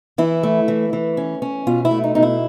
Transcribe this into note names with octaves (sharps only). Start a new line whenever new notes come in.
E3 E4
A3
E3
E3
C#4
C#4
B2 F4
E4
A3
D#4
B2 D#4
E4